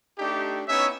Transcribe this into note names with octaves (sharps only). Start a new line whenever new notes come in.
A3 D4 D#4 G4
B3 C#4 D#4 E4 C#5 E5